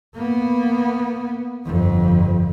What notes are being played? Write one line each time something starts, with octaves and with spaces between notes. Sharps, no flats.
A#3 B3
G1 F2